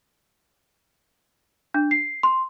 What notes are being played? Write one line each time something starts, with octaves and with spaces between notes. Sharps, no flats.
D4
C7
C6